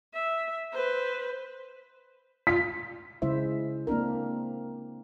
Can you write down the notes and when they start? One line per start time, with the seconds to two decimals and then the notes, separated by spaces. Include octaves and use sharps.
0.14 E5
0.72 B4 C5
2.47 F4 B6
3.22 C#3 G#3 E4 C5 E5
3.87 A#3 C4 D4 A#4